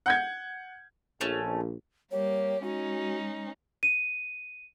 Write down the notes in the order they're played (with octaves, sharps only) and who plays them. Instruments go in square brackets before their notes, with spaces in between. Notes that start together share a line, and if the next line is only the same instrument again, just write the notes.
[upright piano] F#5 G6 G#6
[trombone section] A#1 [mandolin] A3 C#4
[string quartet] G3 A#3 G4 [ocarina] C#5
[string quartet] G#3 C#4 D#4 [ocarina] F#4
[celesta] D#7